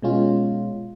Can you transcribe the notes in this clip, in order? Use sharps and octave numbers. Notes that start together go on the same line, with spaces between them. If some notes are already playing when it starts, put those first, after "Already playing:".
B2 G#3 C#4 F4